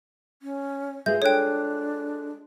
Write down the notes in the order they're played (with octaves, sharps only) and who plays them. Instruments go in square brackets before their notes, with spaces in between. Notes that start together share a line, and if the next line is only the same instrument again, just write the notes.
[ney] C#4
[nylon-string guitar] G#3 F4 G#4 [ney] B4 [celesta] E5 [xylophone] G6
[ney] D4 [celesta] A4 F#6 [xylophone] C#5 G5